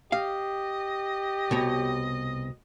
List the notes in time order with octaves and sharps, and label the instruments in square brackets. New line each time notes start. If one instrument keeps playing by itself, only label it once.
[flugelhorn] G4 [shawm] D#5 [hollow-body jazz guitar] F5
[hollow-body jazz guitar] C2 B2 C#5